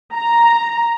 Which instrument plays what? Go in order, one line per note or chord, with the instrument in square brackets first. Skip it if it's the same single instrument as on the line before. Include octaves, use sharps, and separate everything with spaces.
[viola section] A#5